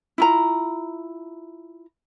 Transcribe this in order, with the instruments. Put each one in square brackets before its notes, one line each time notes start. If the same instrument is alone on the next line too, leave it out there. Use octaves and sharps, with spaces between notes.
[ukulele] E4 F4 A#5